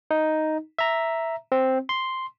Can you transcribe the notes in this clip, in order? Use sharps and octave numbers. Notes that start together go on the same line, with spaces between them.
D#4
E5 A#5
C4
C6